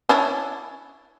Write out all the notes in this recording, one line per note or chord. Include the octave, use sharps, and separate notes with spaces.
C#4 D4 E4